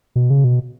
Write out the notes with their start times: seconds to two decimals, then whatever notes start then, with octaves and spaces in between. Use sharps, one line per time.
0.16 B2
0.30 C#3
0.44 B2